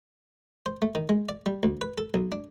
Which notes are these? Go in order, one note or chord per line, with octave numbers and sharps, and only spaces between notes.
C5
A3
D#3
G#3
D5
G3
D2
B4
A4
B1
D4